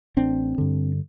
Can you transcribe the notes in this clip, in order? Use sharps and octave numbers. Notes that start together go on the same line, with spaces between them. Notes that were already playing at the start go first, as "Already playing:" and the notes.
A1 C4 D4
G2 D3